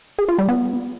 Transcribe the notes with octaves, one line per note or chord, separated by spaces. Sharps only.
G#4
F4
G3
B3